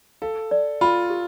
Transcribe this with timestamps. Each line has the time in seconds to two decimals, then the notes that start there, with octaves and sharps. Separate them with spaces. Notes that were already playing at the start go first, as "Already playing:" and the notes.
0.22 A4 F5
0.51 D5
0.81 F4 B5
1.10 G4